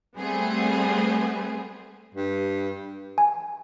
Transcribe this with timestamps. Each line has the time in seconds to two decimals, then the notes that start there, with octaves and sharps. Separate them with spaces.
0.16 G3 A3 B3 C4 G#4
2.15 G2
3.18 G#5